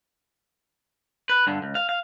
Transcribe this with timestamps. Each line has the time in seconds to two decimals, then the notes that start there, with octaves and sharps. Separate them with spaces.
1.30 B4
1.47 G2 D3
1.62 C#2
1.75 F5
1.89 F5